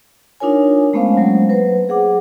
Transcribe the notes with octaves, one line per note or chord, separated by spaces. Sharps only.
D4 D#4 F4 A#4 C#5 G#5
G#3 A3 B3 C#4 C5 F5
F#3 G#3 A#3
F#3 B4 C5
G#4 F#5 D6